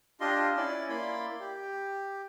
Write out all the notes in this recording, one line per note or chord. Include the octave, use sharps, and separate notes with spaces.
D4 F4 G4 D#5 C6
C#4 E4 D5
A#3 E4 D5 B5 C6
G4